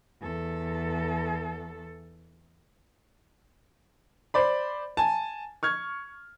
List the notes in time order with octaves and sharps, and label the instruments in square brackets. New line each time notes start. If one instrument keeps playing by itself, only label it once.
[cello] E2 A4
[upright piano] C5 D5 B5
G#5 A5
C#6 F6 G#6